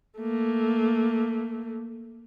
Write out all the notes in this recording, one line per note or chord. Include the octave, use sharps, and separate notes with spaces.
A3 A#3